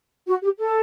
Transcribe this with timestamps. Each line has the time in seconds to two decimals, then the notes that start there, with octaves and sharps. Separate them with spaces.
0.27 F#4
0.42 G4
0.57 A4